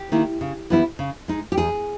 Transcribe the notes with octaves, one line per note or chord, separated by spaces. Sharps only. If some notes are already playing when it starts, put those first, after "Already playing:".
Already playing: G4
D#3 A#3 E4
C#3
E3 G3 B3 E4
C#3
G#3 D#4
G4
E2 G#4